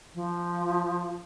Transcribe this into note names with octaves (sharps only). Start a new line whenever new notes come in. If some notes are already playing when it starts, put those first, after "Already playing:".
F3